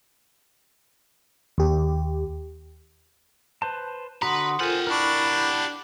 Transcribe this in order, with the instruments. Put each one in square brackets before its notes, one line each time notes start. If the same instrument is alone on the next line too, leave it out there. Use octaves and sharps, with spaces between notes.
[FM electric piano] D#2 G4
[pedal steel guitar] B4 C5 A5
[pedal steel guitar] D3 F#4 A#5 [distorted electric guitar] B4 [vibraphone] F#5 C6 D#6
[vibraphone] F4 A4 A#4 [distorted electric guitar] G4 F#5 [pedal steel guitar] C5 G#5
[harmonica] D4 [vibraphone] E4 B5 [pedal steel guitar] A#4 C#6